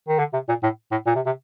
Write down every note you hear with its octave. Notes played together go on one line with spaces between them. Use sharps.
D#3
D3
C3
A#2
A2
A2
A#2
C3
C3